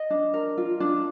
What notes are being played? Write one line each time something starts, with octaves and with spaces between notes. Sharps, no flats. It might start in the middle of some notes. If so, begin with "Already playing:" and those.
Already playing: D#5
D4
A#4
F4
D4